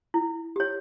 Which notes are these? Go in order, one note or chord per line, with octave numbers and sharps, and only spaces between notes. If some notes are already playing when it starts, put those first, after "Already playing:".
E4
G4 C#5